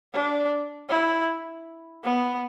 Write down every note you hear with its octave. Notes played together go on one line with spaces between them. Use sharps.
D4
E4
B3